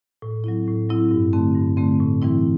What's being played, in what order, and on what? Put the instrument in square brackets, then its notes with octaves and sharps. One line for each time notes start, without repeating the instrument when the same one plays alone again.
[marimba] A2
F#3 C4 E4
A2
F#3 C4 E4
G2
D3 A3 C4
G2
D3 A3 C4
A2
E3 G3 C4 E4